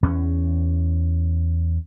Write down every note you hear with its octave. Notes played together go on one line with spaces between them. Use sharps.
E2 C#4